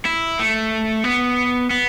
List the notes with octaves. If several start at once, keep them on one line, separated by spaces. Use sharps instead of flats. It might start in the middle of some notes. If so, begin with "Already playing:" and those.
E4
A3
B3
B3